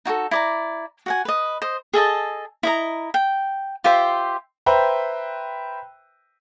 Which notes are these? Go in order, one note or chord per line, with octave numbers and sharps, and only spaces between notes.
D#4 F#4 G4 A4
E4 D5 A#5
F#4 F#5 G#5
B4 D#5
C5 D#5
G#4 A4 D#5 A5
E4 D#5 A#5
G5
F4 G4 C5 E5
B4 C5 E5 G5 A#5